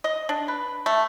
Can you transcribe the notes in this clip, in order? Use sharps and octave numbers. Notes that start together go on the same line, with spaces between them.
D#5
D4
B4
A3